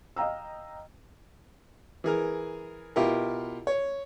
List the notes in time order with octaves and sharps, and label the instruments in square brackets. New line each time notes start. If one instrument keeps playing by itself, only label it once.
[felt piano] D#5 F5 G5 A#5 E6
[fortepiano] E3 G#4 A#4
B2 E4 F4 G4 A#4
C#5